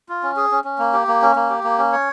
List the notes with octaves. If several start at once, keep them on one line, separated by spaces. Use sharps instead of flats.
F4
C#4
G#4
C#4
C#4
A#3
G4
A#3
C#4
A#3
G4
A#3
C#4
C#5